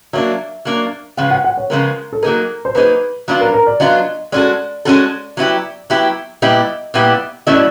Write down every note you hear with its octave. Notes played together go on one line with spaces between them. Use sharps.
F#3 A#3 D4 E5
F#3 A#3 D4
C#3 F3 G#3 B3 F5
F#5
F#5
C#5
C#3 F3 G#3 B3 A#4
A4
F#3 A#3 D#4 G#4 A#4
C5
F#3 A#3 D#4 G#4 B4
F#3 B3 D4 F4
A#4
A#4
D5
F#3 B3 D4 F4 D#5
G#3 C#4 F#4 A4 D5
G#3 C#4 F#4 A4
F#3 B3 E4 G4
F#3 B3 E4 G4
A#2 G3 B3 E4 G4 D#5
A#2 G3 B3 E4 G4
F#3 A3 C#4 E4 A4 D#5
D5